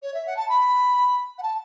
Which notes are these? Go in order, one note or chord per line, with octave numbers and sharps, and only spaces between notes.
C#5
E5
F#5
A5
B5
F#5
A5